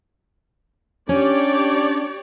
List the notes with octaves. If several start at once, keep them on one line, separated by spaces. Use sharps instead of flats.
C#4 D4 G4 C#5 D5